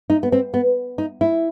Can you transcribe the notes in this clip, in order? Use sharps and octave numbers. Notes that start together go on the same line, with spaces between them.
D#4
B3
C4
B3
D#4
E4